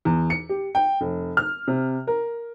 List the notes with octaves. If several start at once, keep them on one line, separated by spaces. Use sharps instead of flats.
E2
C#7
G4
G5
F1
F6
C3
A#4